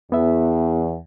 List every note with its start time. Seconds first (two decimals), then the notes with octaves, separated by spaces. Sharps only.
0.12 E2 B3 E5